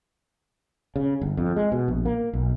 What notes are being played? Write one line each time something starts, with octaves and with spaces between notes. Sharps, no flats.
C#3
G1
F2
G#3
B2
A#1
A#3
B1